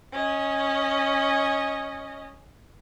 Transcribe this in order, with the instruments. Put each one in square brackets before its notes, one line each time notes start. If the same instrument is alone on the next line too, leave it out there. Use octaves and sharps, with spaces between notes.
[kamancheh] C#4 D#5